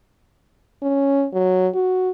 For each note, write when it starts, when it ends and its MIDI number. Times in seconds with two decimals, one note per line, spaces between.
0.82 1.26 61
1.33 1.68 54
1.74 2.10 66